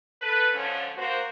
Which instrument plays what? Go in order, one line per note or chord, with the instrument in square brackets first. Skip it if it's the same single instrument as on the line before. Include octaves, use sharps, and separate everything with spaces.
[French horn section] A4 B4
G#2 D3 F3 A3 C#4
A#3 F#4 C5